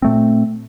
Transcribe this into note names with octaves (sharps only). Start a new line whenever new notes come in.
A#2 A3 C4